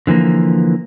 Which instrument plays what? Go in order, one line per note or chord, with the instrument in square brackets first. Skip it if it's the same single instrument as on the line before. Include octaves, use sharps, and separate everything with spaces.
[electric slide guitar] D3 E3 F3 A#3